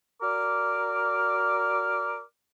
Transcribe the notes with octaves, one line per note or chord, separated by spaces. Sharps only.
F#4 A#4 D5 D6 F6